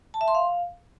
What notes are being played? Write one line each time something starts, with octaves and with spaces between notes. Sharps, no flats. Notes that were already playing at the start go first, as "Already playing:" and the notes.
A5
E5
C6
F5